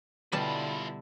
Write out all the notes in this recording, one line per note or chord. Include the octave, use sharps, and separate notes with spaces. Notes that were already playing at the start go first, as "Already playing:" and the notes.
B2 D3 G3 E4 F4 B4 A5